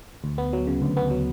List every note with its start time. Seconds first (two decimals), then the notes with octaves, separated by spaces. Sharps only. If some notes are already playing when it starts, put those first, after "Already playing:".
0.24 D2
0.38 B3
0.53 F#3
0.67 C#3
0.82 D2
0.97 B3
1.11 F#3